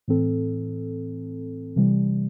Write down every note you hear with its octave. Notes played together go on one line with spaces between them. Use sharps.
A2 E3 C4 A4
C3 E3 G3